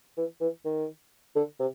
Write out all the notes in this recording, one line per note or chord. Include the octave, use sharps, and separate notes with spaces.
E3
E3
D#3
D3
C3